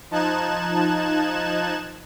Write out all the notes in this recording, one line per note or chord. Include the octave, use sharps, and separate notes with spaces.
F3 D#4 A5 F#6 G#6 E7